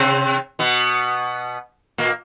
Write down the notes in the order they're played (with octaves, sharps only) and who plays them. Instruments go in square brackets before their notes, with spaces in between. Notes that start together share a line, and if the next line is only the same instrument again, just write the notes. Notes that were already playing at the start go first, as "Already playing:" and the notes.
Already playing: [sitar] C3 C4
B2 B3
A#2 A#3